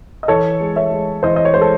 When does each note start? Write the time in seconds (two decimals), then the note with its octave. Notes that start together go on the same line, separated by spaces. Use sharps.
0.23 D#5
0.28 E3 A4 C#5
0.60 G#3
0.76 C#5 E5
0.91 G#3
1.23 E3 C5 D#5
1.36 D#5
1.45 C#5
1.54 G#3 C5
1.61 A4